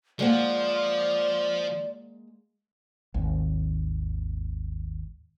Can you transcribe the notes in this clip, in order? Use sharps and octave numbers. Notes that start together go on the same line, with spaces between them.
F3 G#3 A#3 D5 F#5
G#1 D#2